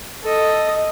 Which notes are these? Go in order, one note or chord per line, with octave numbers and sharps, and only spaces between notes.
A4 D#5